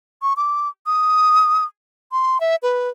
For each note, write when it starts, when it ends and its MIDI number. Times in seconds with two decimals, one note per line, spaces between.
0.22 0.33 85
0.37 0.68 86
0.86 1.65 87
2.12 2.40 84
2.40 2.56 76
2.63 2.89 71